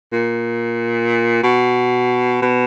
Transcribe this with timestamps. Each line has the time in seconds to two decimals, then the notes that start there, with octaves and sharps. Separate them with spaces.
0.13 A#2
1.43 B2
2.42 B2